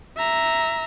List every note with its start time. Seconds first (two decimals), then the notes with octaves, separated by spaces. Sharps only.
0.17 E5 A#5